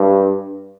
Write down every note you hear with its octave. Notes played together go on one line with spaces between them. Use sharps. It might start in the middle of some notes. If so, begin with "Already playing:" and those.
Already playing: G2